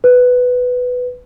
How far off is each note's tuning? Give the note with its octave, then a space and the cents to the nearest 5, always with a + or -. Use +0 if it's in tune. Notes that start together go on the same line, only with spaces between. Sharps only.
B4 +10